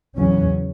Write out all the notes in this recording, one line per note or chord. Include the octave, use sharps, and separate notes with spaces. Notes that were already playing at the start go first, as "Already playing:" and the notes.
E2 C#3 F#3 C#4